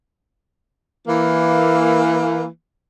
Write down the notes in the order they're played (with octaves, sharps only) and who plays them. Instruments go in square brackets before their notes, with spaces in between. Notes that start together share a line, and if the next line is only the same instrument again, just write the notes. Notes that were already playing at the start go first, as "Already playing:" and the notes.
[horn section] E3 A#3